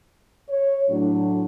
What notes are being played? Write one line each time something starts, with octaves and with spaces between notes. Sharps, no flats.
C#5
A2 F#3 D4